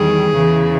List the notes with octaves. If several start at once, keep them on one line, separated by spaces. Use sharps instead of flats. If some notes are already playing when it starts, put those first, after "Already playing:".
Already playing: E2 D#3 G3 G#4
E2 C#3 E3